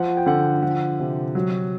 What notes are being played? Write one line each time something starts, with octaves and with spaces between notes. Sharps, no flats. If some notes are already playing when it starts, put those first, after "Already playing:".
Already playing: F3 F#5
G5
D3 F#5
F3 F#5
C3
F#3